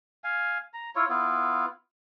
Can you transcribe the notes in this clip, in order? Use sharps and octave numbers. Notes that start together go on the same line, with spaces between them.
F5 G#5
A#5
E4 F4 C#5
B3 E4 F4